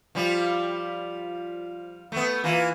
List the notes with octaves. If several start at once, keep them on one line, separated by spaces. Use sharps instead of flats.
F3 G3 F4
A3 B3
E3 A#3 F4